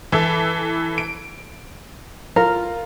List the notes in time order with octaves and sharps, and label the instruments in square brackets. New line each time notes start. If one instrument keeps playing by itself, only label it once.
[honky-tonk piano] E3 E4 A4
D7
[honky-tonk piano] F4 [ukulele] A#4